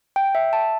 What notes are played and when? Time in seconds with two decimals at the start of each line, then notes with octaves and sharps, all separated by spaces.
0.16 G5
0.35 E5
0.53 A5